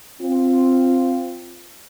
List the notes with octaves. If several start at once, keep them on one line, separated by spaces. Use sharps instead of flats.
C4 F4